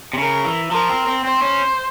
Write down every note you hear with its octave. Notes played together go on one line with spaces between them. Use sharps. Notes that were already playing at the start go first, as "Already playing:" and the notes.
C3
C#3 A#4
E3
F3 A#4
C4
C4
C4 C5
C#4